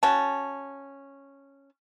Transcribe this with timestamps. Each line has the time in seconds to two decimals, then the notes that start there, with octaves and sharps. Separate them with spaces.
0.03 C#4 F#4 A5